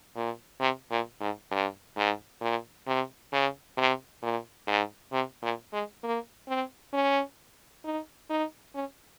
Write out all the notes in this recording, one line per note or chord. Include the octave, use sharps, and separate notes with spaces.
A#2
C3
A#2
G#2
G2
G#2
A#2
C3
C#3
C3
A#2
G#2
C3
A#2
G#3
A#3
C4
C#4
D#4
D#4
C#4